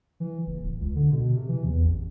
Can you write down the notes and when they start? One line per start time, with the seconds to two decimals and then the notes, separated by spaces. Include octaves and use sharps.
0.20 E3
0.46 F#1
0.61 D1
0.80 C#2
0.95 D3
1.12 B2
1.36 C3
1.48 E3
1.64 E2
1.83 A1